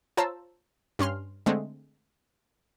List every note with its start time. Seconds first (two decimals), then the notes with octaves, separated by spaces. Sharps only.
0.17 F4 C5 C#5 A5 A#5 E6
0.99 G2 C#4 C6 F6
1.46 D3 G#3 A3 C4